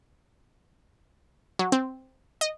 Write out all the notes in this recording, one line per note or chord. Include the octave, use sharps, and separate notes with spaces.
F#3
C4
D#5